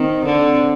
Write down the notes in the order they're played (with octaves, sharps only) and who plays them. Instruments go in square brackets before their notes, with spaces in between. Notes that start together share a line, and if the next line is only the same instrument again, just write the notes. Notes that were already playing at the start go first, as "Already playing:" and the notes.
Already playing: [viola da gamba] D#3 [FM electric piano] C4
[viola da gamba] D3